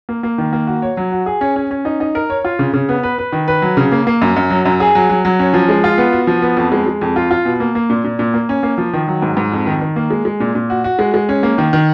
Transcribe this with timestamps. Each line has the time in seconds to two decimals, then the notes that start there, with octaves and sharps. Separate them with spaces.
0.09 A#3
0.23 A#3
0.38 D#3
0.53 A#3
0.67 F#4
0.82 C#5
0.97 F#3
1.12 F#4
1.26 G#4
1.41 C#4
1.56 C#4
1.71 C#4
1.85 D#4
2.00 D#4
2.15 A#4
2.30 C#5
2.44 F4
2.59 C#3
2.73 C#3
2.89 B3
3.03 B4
3.18 B4
3.32 D#3
3.48 B4
3.62 F#3
3.77 C#3
3.92 A#3
4.07 A#3
4.21 F#2
4.36 F#2
4.50 F#3
4.65 F#2
4.80 G#4
4.95 F#3
5.09 F#3
5.25 F#3
5.39 C#4
5.54 F3
5.69 G#3
5.84 F4
5.98 B3
6.12 F#4
6.27 F3
6.42 B3
6.57 F2
6.72 G#3
6.86 G#3
7.01 F2
7.16 F4
7.31 F4
7.45 B2
7.60 A#3
7.75 A#3
7.90 A#2
8.04 A#2
8.19 A#2
8.34 A#3
8.49 C#4
8.63 A#3
8.78 F3
8.93 D#3
9.08 F#3
9.22 G#2
9.37 G#2
9.52 F2
9.66 D#3
9.81 D#3
9.96 A#3
10.10 G#3
10.25 G#3
10.40 A#2
10.55 A#2
10.70 F#4
10.84 F#4
10.99 G#3
11.14 G#3
11.29 C#4
11.43 A#3
11.58 D#3
11.73 D#3